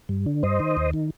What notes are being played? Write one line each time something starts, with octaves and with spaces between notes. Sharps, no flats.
G2
D3
G2 C5 D#5
D#3
D#2
D#3